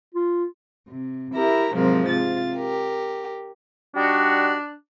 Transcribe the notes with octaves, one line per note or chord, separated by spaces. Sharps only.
F4
C3
E4 G4 A#4 E5 A#5
G#2 C3 F3 F#3 A#4
C3 F4 A6
G4 A#4
G3 D4 D#4 F#4